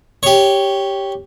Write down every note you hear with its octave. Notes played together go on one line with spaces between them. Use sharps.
G4 C#5